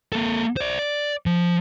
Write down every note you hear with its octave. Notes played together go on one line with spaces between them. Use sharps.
A#3 A4
C5 D5
D5
F3